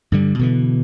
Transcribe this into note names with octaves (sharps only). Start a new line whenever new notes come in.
G2 D3 G3
B2 D3 E3